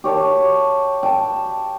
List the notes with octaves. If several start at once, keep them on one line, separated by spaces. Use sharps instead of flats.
G4 C#5 F5 A5
G5 A5